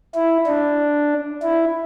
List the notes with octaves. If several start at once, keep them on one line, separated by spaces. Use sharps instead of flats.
E4
D4
E4